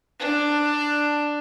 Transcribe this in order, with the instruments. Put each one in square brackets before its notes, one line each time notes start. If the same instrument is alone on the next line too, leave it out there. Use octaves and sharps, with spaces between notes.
[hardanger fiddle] D4